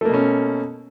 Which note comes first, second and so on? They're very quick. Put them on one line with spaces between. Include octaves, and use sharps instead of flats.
A3 A#3 B2 C#4